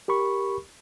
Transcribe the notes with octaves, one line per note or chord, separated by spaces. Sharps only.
G4 A#4 B5 C#6